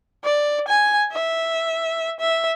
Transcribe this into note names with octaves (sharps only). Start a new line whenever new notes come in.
D5
G#5
E5
E5